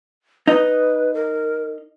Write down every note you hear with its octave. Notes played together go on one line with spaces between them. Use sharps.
D#4 B4 D#5
A#4